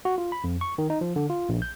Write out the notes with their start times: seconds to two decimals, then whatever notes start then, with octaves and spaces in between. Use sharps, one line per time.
0.05 F#4
0.18 F4
0.32 B5
0.44 F2
0.61 C#6
0.78 D#3
0.90 D#4
1.01 F3
1.16 D3
1.30 F4
1.49 A#1
1.62 G6